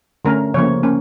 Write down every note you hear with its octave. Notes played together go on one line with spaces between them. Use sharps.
D3 A3 C#4 A#4
C#3 F3 A#3 C#5
A#3 C#4